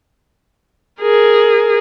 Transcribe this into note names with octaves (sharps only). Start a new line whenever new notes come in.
G#4 A#4